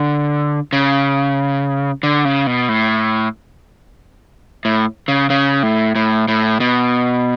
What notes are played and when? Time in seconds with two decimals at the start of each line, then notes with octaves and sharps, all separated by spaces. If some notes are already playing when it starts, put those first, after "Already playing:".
Already playing: D3
0.73 C#3
2.03 D3
2.25 C#3
2.47 B2
2.69 A2
4.65 A2
5.08 C#3
5.30 C#3
5.63 A2
5.95 A2
6.28 A2
6.60 B2